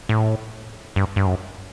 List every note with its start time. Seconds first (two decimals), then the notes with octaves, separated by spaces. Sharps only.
0.09 A2
0.96 G2
1.16 G2
1.26 F#2